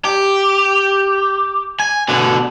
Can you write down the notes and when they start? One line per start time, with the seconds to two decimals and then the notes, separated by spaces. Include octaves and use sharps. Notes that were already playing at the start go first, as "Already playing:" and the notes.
0.05 G4
1.80 G#5
2.08 B2 D3